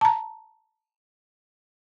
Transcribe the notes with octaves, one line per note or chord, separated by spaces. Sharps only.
A5 A#5